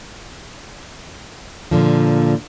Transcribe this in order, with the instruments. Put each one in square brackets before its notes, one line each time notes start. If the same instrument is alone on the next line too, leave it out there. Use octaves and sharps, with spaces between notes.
[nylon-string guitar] A#2 D3 F3